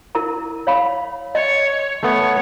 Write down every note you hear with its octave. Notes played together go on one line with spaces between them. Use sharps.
E4 A#4 A#5
C#5 F5 B5
C#5 D#5
A3 B3 C#5